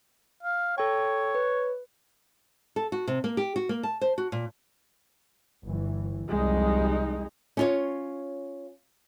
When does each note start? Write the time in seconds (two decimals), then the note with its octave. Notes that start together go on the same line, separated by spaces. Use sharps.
0.43 F5
0.78 A4 C#5 G5
1.35 B4
2.76 A4
2.92 F#4
3.07 C3
3.24 A#3
3.37 G4
3.56 F#4
3.69 A#3
3.83 A5
4.01 C5
4.18 F#4
4.32 A#2
5.65 G1 E3
6.29 C2 F2 G3 G#3 D#4
7.57 C#4 F4 C#5